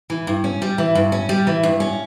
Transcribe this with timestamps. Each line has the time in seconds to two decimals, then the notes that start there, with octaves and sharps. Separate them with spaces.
0.10 E3
0.27 G2
0.44 C#4
0.62 G3
0.78 E3
0.95 G2
1.12 C#4
1.29 G3
1.47 E3
1.63 G2
1.80 C#4